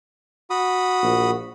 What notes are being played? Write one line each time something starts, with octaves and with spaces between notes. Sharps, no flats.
F#4 B5 D#6
A#1